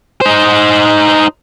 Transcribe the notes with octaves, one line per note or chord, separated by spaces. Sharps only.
D#4 C5